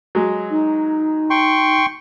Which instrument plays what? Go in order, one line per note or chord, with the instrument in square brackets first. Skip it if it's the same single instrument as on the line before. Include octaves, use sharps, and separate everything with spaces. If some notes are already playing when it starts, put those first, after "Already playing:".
[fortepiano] F#3 G#3
[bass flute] D#4
[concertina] G5 C6 C#6